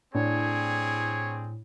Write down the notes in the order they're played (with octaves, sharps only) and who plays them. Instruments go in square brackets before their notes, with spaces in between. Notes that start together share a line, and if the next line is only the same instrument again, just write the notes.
[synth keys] A2 [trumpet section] G3 C4 G#4 [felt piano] D4 [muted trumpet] C#5